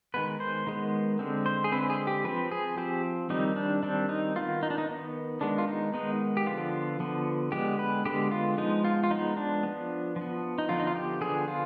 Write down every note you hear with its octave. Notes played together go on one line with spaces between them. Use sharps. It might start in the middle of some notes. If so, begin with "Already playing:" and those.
D#3 G#3 B3 B4
C5
D#3 G#3 B3
D3 G#3 C4
C5
G#4
D3 G#3 C4 B4
G#4
G4
F3 C4 B4
G#4
F3 C4 G4
D#3 G3 C4 D#4
D4
D#3 G3 C4 D4
D#4
D#3 B3 F4
D#4
D4
D#4
D#3 B3
D#3 G#3 B3 D4
F4
D#4
D#3 G#3 B3 D#4
G4
D3 F3 B3 F4
D3 F3 B3
D3 G#3 B3 G4
B4
D3 G#3 B3 G4
F4
F3 G#3 B3 D#4
F4
F4
F3 G#3 B3 D#4
D4
F3 B3
F3
B3
D#4
D3 F3 B3 F4
D#4
F4
G4
D3 F3 B3 G#4
F4